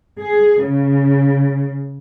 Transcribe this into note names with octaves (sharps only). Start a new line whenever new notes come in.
G#4
C#3